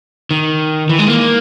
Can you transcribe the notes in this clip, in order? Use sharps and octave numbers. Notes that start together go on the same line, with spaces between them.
D#3
E3
G#3
A#3